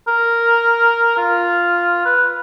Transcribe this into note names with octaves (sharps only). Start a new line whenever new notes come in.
A#4
F4
B4